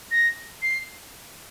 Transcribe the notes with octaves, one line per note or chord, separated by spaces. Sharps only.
A#6
C7